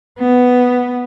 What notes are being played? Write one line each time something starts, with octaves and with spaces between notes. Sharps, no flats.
B3